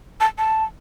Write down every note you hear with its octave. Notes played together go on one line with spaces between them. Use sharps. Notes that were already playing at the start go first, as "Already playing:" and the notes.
A5
A5